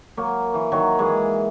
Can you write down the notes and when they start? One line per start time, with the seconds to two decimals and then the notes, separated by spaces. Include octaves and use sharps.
0.17 F#3 A#3
0.54 E3
0.72 D#3 F#3
0.99 E3 G#3